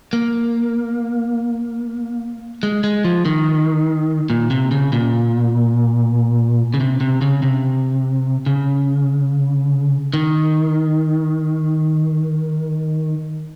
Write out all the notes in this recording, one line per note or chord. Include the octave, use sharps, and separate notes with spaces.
A#3
G#3
G#3
F3
D#3
A#2
C3
C#3
A#2
C#3
C3
C3
C#3
C3
C#3
D#3